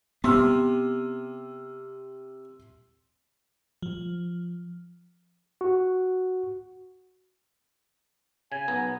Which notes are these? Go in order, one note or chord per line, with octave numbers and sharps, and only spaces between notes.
C3 B3 C6 E6 F6
F3
F#4
C#3 G#5
B1 B3 A#5